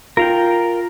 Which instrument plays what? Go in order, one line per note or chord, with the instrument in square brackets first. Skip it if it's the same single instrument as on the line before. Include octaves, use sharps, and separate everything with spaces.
[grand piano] F4 [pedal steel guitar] A#4 F5 G5